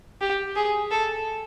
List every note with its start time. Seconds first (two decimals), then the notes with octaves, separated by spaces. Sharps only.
0.21 G4
0.56 G#4
0.91 A4